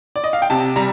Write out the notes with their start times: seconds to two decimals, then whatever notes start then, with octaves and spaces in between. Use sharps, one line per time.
0.16 D5
0.24 D#5
0.33 F5
0.42 G5
0.50 C3 A5
0.76 G3 A#5